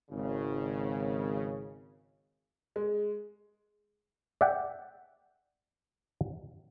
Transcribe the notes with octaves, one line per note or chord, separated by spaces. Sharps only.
G#1 C#3
G#3
D5 E5 F#5 G5